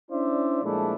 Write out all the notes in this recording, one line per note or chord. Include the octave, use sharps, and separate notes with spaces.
C#4 D4 E4 C5 D5 E5
A#2 F3 G#3 A3 D4 E4